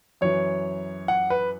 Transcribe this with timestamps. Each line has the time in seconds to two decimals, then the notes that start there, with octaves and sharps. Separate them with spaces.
0.21 F#2 E3 C#5
1.08 F#5
1.30 B4